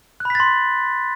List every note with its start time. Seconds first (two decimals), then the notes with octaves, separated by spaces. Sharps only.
0.20 F#6
0.25 B5
0.30 B6
0.35 A6
0.40 C6